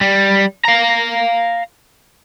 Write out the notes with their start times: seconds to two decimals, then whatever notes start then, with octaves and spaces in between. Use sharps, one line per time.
0.01 G3
0.65 F5 A#5